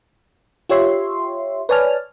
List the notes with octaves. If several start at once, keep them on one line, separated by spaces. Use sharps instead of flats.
F4 G4 C#5 E5 C6
B4 C#5 D5 G#5 A5 F6